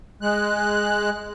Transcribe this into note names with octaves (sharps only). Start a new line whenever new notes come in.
G#3 F#6